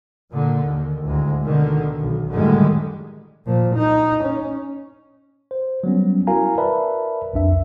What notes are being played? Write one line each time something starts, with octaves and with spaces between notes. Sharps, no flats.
A#2 D3
D#2
D2 A2 G#3
B2 D3 D#3
B1
F#2 A2 D3 D#3 G3 G#3
A#2 F3
D#4
C#4
C5
F#3 G3 B3 C#4
E4 F#4 A#4 F5 G#5 A#5
A#4 B4 D5 E5 A5 B5
B1 F2 D4 E5